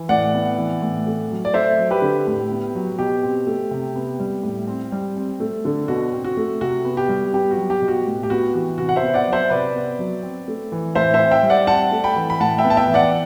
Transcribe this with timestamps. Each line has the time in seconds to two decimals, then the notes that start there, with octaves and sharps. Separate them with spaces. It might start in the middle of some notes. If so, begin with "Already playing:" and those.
Already playing: E3
0.09 A2 D5 F#5
0.34 B3
0.58 E3
0.82 A2
1.07 A3
1.31 F#3
1.45 D5
1.54 A3 C5 E5
1.79 F#3
1.90 G4 B4
2.02 D3
2.27 A2
2.51 B3
2.75 F#3
2.99 B2 G4
3.23 C4
3.47 A3
3.71 C3
3.96 B3
4.20 G3
4.43 A2
4.67 C4
4.92 G3
5.17 C4
5.40 A3
5.65 D3
5.88 B2 F#4
6.13 C4
6.24 F#4
6.37 A3
6.61 C3 F#4
6.85 B3
6.97 G4
7.09 G3
7.33 B3 G4
7.51 F#4
7.57 F#3
7.70 G4
7.82 B2
7.88 F#4
8.07 A2
8.23 G4
8.30 B3 F#4
8.54 E3 F#4
8.78 C3 F#4
8.89 F#5
8.96 C5 E5
9.02 B3
9.14 D5 F#5
9.27 F#3
9.33 C5 E5
9.50 C3 B4 D5
9.75 B3
9.99 F#3
10.23 C4
10.48 A3
10.72 E3
10.95 A2 C5 E5
11.14 C5 E5
11.19 C4
11.31 E5 G5
11.43 G3
11.50 D5 F#5
11.67 C4 F#5 A5
11.92 A3
12.04 G5 B5
12.16 E3
12.30 B5
12.40 A2 F#5 A5
12.58 E5 G5
12.64 B3
12.70 A5
12.77 E5 G5
12.88 E3
12.94 D5 F#5